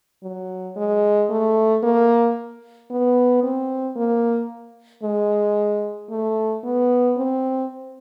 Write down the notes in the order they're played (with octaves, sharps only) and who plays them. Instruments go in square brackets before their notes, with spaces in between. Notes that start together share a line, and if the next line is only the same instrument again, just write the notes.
[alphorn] F#3
G#3
A3
A#3
B3
C4
A#3
G#3
A3
B3
C4